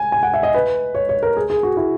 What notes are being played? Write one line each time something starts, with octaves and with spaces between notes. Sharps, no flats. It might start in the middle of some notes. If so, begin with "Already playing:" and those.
Already playing: G#5
G#5
F#5
E5
D#5
B4
C#5
C#5
A#4
G#4
G#4
F#4
E4